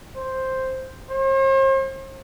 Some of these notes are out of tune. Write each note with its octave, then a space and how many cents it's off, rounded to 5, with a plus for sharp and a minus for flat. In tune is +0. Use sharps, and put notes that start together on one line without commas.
C5 +5
C5 +45